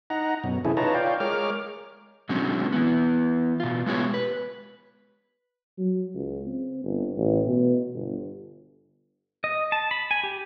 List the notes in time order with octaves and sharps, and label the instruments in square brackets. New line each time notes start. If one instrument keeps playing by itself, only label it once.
[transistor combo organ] D#4 F#5 A#5
F#2 B2
C3 E3 C#4 E4 G#4 A4
D#4 F4 B4 C#5 A5 A#5
F4 C#5 D5 F5 G5
G#3 A#4 C#5 D6 F6
[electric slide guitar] B2 D3 F#3 G#3 C4 C#4
E3 B3
B2 F4
G#3 B3 G4 C#5
B4
[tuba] F#3
C#2
C4
G1
A1
B2
G1
[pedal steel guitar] D#5
A5
B5
G#5
G4